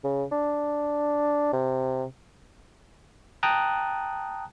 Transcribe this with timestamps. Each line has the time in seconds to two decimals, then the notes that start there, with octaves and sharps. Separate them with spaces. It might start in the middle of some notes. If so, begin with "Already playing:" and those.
0.04 C#3
0.32 D4
1.53 C3
3.43 G5 A5 A#5 D#6 F#6